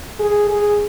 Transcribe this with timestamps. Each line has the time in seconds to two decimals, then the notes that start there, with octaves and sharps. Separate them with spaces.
0.19 G#4
0.51 G#4